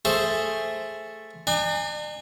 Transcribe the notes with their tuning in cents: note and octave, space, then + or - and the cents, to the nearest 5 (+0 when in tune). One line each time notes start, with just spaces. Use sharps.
A3 +0 G#4 +0 C5 +5
D4 +45 G#5 -25